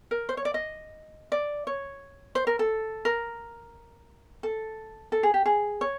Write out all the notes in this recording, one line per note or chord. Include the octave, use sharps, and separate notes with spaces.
A#4
C5
C#5
D5
D#5
D5
C#5
C5
A#4
A4
A#4
A4
A4
G#4
G4
G#4
C#5